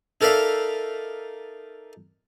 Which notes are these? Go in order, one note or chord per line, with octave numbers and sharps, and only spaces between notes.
D#4 A4 A#4 D5 E5 F5